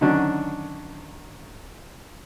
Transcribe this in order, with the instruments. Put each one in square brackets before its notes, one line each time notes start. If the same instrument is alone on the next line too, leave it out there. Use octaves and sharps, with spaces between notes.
[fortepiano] D3 D#3 F#3 C#4 D4